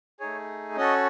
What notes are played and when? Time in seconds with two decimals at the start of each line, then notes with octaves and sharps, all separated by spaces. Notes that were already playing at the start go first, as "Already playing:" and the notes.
0.20 A3 D#4 G#4 C#5
0.76 C#4 F#4 A4 D#5